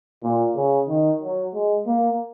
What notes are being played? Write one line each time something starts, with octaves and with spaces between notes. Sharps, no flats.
A#2
C#3
D#3
F#3
G#3
A#3